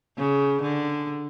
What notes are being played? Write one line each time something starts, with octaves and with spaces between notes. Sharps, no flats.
C#3
D3